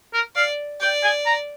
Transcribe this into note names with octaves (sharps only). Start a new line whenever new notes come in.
A#4
D5 F5
D5 G5
G#5
A#5